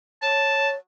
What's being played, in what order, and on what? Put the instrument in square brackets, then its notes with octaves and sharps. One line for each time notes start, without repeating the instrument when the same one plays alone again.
[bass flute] C#5 [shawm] A5